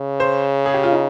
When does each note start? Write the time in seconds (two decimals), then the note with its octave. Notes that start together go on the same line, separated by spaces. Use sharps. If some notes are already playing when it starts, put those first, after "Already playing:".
Already playing: C#3
0.20 C5
0.66 G#4
0.74 G4
0.83 F4
0.92 D#4